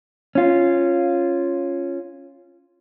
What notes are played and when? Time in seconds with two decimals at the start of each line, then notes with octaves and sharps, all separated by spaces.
0.35 C#4 F4